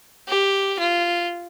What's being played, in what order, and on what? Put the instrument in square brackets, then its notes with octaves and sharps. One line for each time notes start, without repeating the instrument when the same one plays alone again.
[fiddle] G4
F4